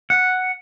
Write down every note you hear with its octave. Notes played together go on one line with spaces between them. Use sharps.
F#5